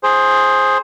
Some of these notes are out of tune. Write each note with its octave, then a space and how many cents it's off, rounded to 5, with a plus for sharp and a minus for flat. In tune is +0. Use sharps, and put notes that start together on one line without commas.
G#4 +0 C5 +15